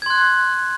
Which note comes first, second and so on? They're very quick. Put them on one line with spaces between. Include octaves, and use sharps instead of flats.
G#6 C6 F#6